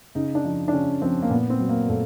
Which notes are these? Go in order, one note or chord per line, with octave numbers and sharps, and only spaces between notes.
C#3 D#4
D4
F3
D4
C#3 C#4
F3 C4
A#3
A#2 B3
C4
F#3
A#3
A#2 A3